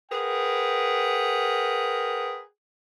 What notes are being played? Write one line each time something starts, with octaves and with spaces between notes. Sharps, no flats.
G#4 A#4 B4 F#5 G5